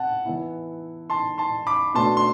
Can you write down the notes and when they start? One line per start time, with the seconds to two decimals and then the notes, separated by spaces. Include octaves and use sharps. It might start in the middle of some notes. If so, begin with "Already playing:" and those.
Already playing: C4 F#5 A5
0.26 E3 B3 E4
1.10 A5 C6
1.38 A5 C6
1.67 B5 D6
1.94 B2 A3 D4 A5 C6
2.17 C6